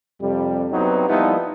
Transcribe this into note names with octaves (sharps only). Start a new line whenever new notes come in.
F2 C3 G3
G2 F#3 B3 C4 D#4
F3 G3 A#3 B3 D#4 E4